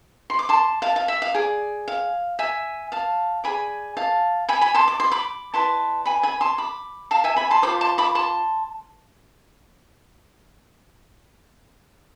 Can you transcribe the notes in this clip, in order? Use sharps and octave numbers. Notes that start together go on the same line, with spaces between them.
C6
D6
A5 C6
F5 A5
F5
E5
F5
G#4 D5
F5
E5 G#5
F5 A5
G#4 B4 D5 G#5 B5
F5 A5
G#5 B5
G#5 B5
A5 C6
D6
C6
B5 D6
E4 B4 D5 A5 C6
G#5 B5
G#5 B5
A5 C6
B5 D6
F5 A5
E5 G#5
G#5 B5
A5 C6
F4 A4 C5 B5 D6
A5 C6
B5 D6
A5 C6